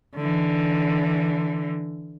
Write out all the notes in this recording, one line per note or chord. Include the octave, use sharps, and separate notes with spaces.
D3 E3